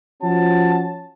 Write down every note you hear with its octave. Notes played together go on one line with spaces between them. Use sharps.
F3 C#4 F#4 A5